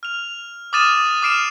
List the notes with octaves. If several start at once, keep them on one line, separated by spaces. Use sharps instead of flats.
F6 F7
D6 D#6 F6 A6 D#7 E7
D6 F6 C7 D7 E7